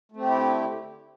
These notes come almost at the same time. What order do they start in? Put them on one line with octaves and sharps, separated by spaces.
A3 C4 G4 E4 D3